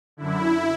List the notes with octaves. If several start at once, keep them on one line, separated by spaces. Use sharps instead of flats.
F#2 D3 E4